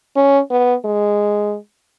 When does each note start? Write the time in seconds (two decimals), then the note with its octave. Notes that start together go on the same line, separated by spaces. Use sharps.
0.16 C#4
0.51 B3
0.85 G#3